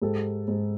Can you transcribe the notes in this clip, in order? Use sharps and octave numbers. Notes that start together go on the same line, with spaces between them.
G#2 G4 A4
G#2